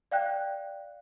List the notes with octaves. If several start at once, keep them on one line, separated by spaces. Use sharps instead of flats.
D5 F5 G5 F#6